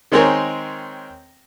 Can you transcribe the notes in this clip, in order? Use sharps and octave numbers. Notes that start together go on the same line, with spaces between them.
D#3 G#3 C4 G#4 A#4 C#5